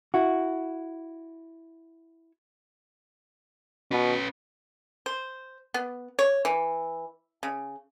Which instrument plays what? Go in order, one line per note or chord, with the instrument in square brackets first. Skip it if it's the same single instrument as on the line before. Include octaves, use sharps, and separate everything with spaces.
[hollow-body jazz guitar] E4 F#4
[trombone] B2 [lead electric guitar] C#4 B4
[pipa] C5
B3
C#5
E3
C#3